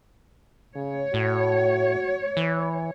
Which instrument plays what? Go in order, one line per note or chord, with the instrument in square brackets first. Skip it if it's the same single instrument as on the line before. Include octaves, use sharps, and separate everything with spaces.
[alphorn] C#3 [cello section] C#5
[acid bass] A2 [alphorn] F#4
[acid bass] E3